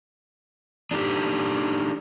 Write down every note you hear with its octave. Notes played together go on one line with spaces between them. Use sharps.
D4 D#4 G4 A4